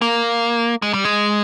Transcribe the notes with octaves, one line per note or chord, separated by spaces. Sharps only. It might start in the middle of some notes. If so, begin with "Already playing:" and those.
A#3
G#3
G3
G#3